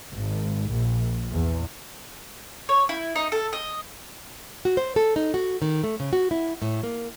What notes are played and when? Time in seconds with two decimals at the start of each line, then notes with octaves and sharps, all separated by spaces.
0.13 G#1
0.71 A#1
1.33 E2
2.69 C#5
2.89 E4
3.16 D#4
3.32 A4
3.53 D#5
4.65 F#4
4.77 C5
4.96 A4
5.16 D#4
5.34 F#4
5.62 D#3
5.84 A3
6.00 C#3
6.13 F#4
6.31 E4
6.62 A2
6.83 A#3